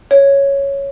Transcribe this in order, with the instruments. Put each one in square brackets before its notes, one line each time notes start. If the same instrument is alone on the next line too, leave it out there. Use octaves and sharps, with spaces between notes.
[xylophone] C#5